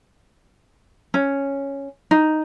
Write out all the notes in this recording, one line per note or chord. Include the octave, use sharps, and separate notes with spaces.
C#4
D#4